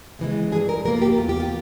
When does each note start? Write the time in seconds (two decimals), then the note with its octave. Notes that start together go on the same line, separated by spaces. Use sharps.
0.19 C#3 E3 G#3
0.52 G2 G#4
0.69 A#4
0.85 E3 A#3 A#4
0.96 F4
1.02 G4
1.18 E2 F4
1.29 G4
1.40 F4